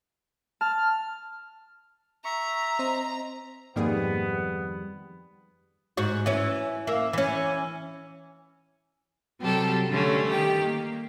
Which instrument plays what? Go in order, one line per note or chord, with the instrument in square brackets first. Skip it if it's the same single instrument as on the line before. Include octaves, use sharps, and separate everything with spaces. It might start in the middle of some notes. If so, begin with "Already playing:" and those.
[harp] A5 [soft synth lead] F6
[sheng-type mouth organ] E5 [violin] A#5 [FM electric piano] C#6
[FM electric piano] C4 C5 D#5
[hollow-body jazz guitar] F2 D#3 G3 [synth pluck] G#2 A#3 G#4 [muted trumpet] B3
[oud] G#2 F#4
E3 C#4
A#3 E5
E3 C#4
[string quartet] C3 F#3 G3 G4 A4
D3 G3 A3 C#4
D#3 G4
A#3